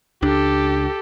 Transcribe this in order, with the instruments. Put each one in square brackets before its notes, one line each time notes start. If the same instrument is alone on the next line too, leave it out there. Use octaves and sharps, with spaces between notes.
[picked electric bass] C#2 D4 [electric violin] G4 A4